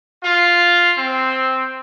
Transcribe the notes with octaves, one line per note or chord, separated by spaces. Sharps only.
F4
C4